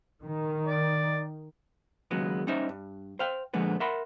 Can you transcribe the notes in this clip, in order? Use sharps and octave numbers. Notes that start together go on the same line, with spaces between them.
D#3
D5
D#2 C#3 F#3 G#3 B3
G3 C#4 D#4 C5 E5
G2
C5 F5 G5
A#2 D3 F3 G#3 B3
A#4 E5 F#5 B5 C6